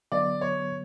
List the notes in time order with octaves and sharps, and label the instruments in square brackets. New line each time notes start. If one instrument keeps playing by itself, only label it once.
[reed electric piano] D3 F#3 B3 [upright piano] D5
[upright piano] C#5